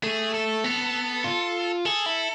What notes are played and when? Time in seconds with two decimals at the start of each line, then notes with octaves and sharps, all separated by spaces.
0.03 A3 G#4
0.34 A4
0.64 B3
1.24 F4
1.86 G#4 A4
2.06 E4